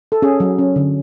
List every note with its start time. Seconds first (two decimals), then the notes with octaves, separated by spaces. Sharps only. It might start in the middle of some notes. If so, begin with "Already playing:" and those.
0.12 A4
0.22 C#4 G#4
0.40 F#3
0.58 C#4
0.76 D3